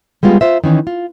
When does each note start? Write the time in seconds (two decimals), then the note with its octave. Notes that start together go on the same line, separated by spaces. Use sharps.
0.23 G3 G#3 B3 F4
0.41 F4 C5 E5
0.64 D#3 E3 C#4 D#4
0.87 F4